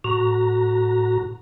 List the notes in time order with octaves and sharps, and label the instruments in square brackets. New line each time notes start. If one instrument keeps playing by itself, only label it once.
[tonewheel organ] A2 F#4 A#5